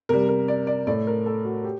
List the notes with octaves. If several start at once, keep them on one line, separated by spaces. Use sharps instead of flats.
C3 G3 A#4
A#4
D5
D5
A2 A3 D5
A#4
A4
F#4
G4